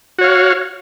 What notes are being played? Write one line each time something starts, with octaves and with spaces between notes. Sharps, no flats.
F#4 C#5 F5